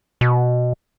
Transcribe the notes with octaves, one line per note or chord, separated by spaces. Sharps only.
B2